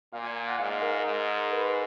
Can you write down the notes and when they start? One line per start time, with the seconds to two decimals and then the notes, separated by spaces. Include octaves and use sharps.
0.13 A#2 F5
0.24 G#5
0.36 G#5
0.48 F#5
0.58 G#2 F5
0.82 A#4
1.05 G#2
1.52 B4